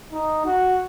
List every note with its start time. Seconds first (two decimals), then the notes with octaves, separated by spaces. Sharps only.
0.12 D#4
0.45 F#4